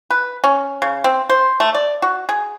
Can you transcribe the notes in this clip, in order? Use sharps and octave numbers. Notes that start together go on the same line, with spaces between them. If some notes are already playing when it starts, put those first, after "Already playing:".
B4
C#4
C#3
C4
C5
A3
D5
F#4
G#4